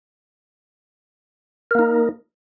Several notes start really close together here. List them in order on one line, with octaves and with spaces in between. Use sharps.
A#4 A#3 D#4